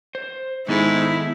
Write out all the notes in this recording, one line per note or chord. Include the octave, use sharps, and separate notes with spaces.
C5
G#2 D#3 B3 E4 A4